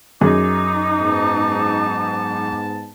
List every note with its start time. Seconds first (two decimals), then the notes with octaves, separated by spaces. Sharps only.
0.21 F#2 D#4 G#4 D6
0.98 G#2 B3 A5